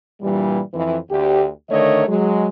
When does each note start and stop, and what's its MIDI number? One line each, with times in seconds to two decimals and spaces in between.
0.21 0.59 43
0.21 0.59 46
0.21 0.59 52
0.21 0.59 55
0.74 0.97 41
0.74 0.97 52
1.10 1.47 38
1.10 1.47 67
1.70 2.04 50
1.70 2.04 51
1.70 2.04 57
1.70 2.04 70
1.70 2.04 73
1.70 2.04 75
2.07 2.47 54
2.07 2.47 56